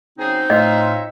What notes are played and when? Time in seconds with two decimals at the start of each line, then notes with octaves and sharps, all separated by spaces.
0.18 F#2 C#3 C4 D#4 G#4
0.50 A2 F4 C#5 D#5 E5 C6 F6